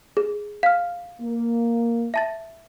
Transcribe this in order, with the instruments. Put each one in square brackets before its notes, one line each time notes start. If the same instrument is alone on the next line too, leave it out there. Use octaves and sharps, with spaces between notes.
[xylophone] G#4
F5 F6
[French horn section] A#3
[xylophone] E5 A5 A6